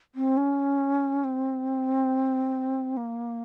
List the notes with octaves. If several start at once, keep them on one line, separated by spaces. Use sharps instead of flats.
C4
C#4
C4
A#3